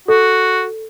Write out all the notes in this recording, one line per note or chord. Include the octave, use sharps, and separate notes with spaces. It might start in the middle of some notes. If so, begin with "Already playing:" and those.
F#4 A4